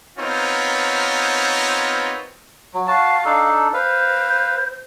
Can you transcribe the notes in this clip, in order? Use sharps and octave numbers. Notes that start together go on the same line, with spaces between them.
B3 C4 D#4 F4 A#4 C#5
F#3
F#4 F5 A5
D4 D#4 A4
B4 C5 F5